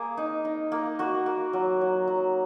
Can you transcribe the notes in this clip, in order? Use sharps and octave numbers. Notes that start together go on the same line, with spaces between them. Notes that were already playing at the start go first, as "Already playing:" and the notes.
Already playing: A#3 G#4
D#4
D#4
A#3
A#3 F#4
A#3
F#3
F#3
F#3